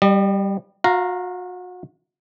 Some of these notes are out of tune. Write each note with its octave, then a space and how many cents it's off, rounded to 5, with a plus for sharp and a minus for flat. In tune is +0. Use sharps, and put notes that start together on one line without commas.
G3 +0 D#5 -45
F#4 -35 F5 +0 A#5 +0